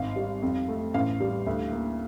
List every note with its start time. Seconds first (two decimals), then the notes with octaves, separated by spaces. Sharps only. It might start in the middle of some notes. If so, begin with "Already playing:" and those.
Already playing: G#1 F5
0.16 G3
0.42 F2
0.68 A3
0.94 A1 F5
1.21 G3
1.46 D2
1.72 A#3